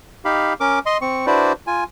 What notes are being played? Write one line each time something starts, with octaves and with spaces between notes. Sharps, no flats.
D#4 G4 F5 B5
C#4 A#4 D6
D#5 C6
C4 C#6
D4 E4 F#4 B4 C5 D5
F4 G#5